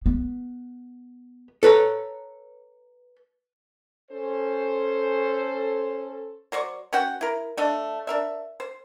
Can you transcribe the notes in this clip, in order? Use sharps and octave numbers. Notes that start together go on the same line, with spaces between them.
B3
A4 B4 C#5 A#5
C#4 A4 C5
F#3 C5 D5 C#6
C#4 F#4 F#5 G5
E4 A#4
A3 D4 D#5
D4 A#4 E5
C5